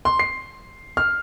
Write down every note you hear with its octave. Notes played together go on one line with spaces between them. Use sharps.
C6
C7
F6